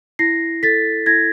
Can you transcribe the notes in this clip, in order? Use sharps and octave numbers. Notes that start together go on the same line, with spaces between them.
E4 A#6 C7
A4 A6 B6
E4 G#6 A#6